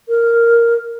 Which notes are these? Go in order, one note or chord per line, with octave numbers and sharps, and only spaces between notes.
A#4